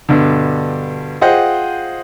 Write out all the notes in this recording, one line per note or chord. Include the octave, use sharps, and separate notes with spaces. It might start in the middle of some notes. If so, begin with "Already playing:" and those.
G2 B2 D3
F4 G#4 C5 D#5 F#5 G5